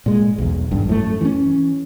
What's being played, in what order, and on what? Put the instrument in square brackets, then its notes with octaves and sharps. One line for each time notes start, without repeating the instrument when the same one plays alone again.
[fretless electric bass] A#2 G#3
B1 E2
G#1 G2
F#2 A2 D3 A3
E3 C#4